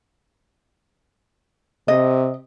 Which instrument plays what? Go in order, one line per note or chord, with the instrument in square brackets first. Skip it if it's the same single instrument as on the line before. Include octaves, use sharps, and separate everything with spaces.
[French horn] C3 [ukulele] D#5